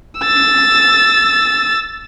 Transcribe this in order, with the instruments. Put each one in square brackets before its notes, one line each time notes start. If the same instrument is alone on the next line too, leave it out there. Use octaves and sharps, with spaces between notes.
[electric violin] E6 A6